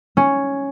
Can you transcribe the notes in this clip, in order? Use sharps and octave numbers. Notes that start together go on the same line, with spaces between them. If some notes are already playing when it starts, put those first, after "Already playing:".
C#4